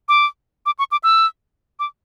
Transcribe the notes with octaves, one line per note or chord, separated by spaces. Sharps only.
D6
D6
C#6
D6
E6
D6